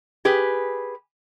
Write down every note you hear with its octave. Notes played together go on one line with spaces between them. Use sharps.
G4 G#4 B4